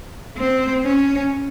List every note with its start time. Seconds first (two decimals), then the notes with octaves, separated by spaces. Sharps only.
0.37 C4
0.84 C#4